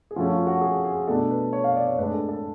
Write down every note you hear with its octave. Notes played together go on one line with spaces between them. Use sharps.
G#4
F3 A3 C#4 F#4
F4
F#4
G#4
G#4
B2 A3 D4 A4
B4
C#5
F5
D5
C#5
A2 G#3 D4 B4
A4
A4